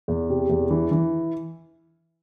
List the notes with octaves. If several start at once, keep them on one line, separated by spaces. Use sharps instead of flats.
E2
C3
E2
E3
E3